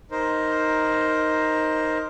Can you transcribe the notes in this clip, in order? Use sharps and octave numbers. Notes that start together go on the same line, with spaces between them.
D#4 A#4 C5